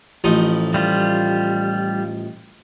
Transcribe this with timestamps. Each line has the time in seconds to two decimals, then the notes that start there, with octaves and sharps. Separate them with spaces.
0.24 A1 F3 D#4
0.74 G3 F4